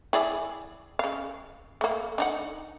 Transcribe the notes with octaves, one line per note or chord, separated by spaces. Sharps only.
E4 G#4 D5
C#3 F5
A3 A#3
D4 D#4 F#5